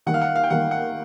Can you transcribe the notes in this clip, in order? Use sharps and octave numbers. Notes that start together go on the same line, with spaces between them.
D#3 G3 A#3 F#5
F5
F#5
F5
G5
D#3 G3 A#3 F#5
F#5